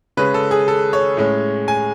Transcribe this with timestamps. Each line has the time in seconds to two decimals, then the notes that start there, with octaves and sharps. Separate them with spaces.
0.17 C#3 G#3 C#4 B4
0.34 A4
0.51 G#4
0.68 A4
0.93 C#5
1.17 A2 G#3 C#4
1.68 G#5